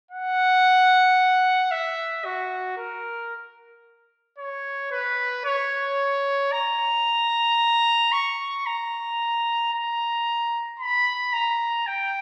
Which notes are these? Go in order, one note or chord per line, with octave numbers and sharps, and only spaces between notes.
F#5
E5
F#4
A#4
C#5
B4
C#5
A#5
C#6
A#5
A#5
B5
A#5
G5